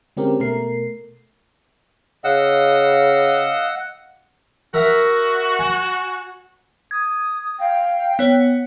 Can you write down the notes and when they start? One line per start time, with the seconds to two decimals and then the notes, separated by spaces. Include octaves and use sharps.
0.17 D3 G#3 C4 C#4 G4 A#4
0.40 B2 A3 A#4 C7
2.24 C#3 D#5 F5 F#5 E6
4.74 F#4 A#4 E5 F#5
5.59 G#5 C#6
6.91 D#6 G#6
7.59 F5 G5
8.19 B3 C#5
8.38 F#5